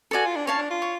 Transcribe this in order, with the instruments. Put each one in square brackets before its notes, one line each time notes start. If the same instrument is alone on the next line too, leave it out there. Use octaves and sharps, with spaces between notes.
[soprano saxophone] F#4 [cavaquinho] A4 D5 G#5
[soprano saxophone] F4
D4
[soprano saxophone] C#4 [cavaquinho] C#5 F5 A5
[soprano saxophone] D4
F4
[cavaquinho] C#5